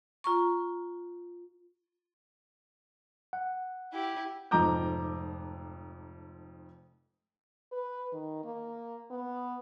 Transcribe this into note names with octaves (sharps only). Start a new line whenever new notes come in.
F4 A#5 C#6
F#5
E4 G4
F1 F2 G#2 A#5 D6 G6
B4
D#3
A#3
B3